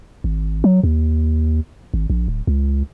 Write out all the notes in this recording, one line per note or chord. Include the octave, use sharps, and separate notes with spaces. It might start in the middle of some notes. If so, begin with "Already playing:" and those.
G#1
F#3
D#2
G#1
A#1
D1
C#2